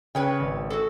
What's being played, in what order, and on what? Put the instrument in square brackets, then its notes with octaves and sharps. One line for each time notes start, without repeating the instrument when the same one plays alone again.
[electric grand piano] C#3 [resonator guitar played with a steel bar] B4 C#5 G5
[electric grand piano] G#1
[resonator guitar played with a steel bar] F#4 A4